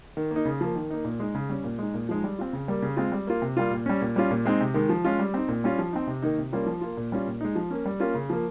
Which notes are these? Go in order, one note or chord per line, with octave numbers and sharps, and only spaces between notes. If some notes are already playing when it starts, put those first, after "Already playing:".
D#3
A#3
D#4
C#3
F3 A#3
D#3
A#3 D#4
A#2
G#3 D#4
C#3
G3 C#4
A#2
G#3 D#4
A#2
F3 G#3 D#4
G3
C4 F4
C#3
G3 A#3
C#3
G#3 C4 F4
G3
A#3 F4
C3
G3 A#3 F4
A#2
G3 C#4
A#2
G3 C#4 F4
A#2
G#3 C4 D#4
C3
D#3 G#3
F3
G#3 C#4 F4
G3
C4 D#4
A#2
G3 C#4 F4
F3
C4 D#4
C3
D#3 A#3 D#4
C3
G3 A#3 C#4 F4
F3
A#3 F4
A#2
G3 C#4 F4
A#2
G#3 D#4
F3
A#3 C#4
G3
A#3 C#4 F4
C#3
F3 A#3